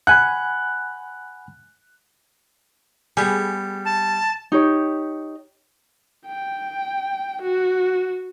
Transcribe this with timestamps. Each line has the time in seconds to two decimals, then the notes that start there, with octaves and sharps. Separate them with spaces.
0.07 F#5 G#5 B5 F#6
3.17 G3 B3 G#4
3.85 A5
4.52 D#4 G4 C#5
6.27 G5
7.42 F#4